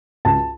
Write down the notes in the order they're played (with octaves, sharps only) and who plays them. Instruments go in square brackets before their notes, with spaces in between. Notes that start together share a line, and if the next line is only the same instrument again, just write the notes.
[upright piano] C#2 A5